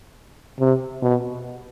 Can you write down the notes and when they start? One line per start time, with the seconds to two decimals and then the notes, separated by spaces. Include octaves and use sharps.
0.60 C3
1.02 B2